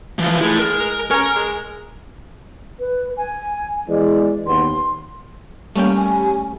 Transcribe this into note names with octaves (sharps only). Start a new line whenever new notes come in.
E3 F3
G#3 A3 E4
A#4
C#4 A#4 A#5
G#3
B4
G#5
E2 E3 G#3 D5
D#2 B3 C6
G3 A3 A#3 C#4 G5
G#5